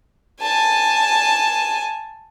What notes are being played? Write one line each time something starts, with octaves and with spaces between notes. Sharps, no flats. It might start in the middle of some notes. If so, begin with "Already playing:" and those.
G#5 A5